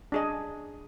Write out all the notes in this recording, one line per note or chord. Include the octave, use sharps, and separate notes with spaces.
D4 G#4 D#5